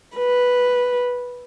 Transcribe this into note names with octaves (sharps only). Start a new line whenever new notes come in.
B4